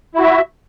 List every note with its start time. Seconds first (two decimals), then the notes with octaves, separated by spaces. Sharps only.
0.15 E4
0.18 F#4
0.22 E5